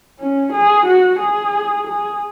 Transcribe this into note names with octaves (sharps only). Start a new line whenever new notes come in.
C#4
G#4
F#4
G#4
G#4